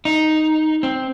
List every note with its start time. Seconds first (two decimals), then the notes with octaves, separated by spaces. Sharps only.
0.05 D#4
0.83 C4